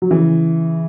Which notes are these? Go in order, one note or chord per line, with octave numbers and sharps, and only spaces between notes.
F#3
C#3 E3